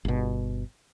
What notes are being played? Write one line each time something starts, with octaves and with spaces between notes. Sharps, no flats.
G1 B2